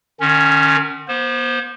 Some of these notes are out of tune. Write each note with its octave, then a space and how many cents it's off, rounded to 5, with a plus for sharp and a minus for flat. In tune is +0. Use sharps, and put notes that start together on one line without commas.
D#3 -40 C#4 +0
B3 -40 C5 +0